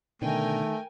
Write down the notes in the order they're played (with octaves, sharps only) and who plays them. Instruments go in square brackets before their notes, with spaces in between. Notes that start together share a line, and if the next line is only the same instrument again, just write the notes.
[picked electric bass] B2 D3 [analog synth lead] D#3 [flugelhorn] A3 [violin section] A#4 G5 G#5